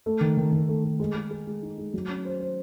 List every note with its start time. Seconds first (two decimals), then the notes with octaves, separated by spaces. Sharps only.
0.06 A3
0.21 D#3
0.37 D#3
0.53 D#3
0.69 A3
0.84 A3
1.00 G#3
1.16 G#3
1.31 G#4
1.47 G#3
1.62 D#4
1.78 G#3
1.94 F#3
2.09 C#4
2.25 C5
2.40 C5